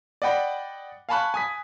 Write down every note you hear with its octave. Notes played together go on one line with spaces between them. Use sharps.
D5 D#5 F#5 G5 B5
F5 G#5 A5 B5 C#6 F#6
G#5 D#6 B6